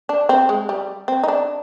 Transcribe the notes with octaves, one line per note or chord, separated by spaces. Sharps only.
D4
C4
G#3
G3
C4
D#4
D4